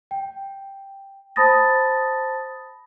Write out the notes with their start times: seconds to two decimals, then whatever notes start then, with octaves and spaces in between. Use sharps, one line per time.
0.11 G5
1.36 C5 A5 B5 D#6 A6 A#6